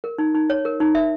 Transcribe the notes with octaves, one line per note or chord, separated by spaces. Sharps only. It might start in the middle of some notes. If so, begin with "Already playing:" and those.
A#4
D#4
D#4
C#5
A#4
D#4
E5